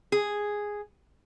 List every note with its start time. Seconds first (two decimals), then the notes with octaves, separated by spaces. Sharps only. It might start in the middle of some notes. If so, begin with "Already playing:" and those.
0.12 G#4